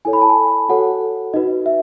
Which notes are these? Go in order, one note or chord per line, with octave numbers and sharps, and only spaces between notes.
E4 A4 C#5 G#5
B5
A5
G#5
F#4 A4 C#5 F#5
D#4 F#4 B4 D#5
E5